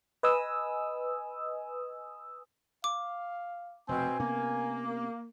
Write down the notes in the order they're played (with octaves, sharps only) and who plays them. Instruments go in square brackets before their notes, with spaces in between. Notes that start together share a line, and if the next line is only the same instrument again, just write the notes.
[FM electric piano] B4 D#5 G#5 D#6 E6
[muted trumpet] F5 [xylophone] D6
[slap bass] F1 [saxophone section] B2 C4 [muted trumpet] G#5
[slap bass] C3 B3 C#4 [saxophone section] A#3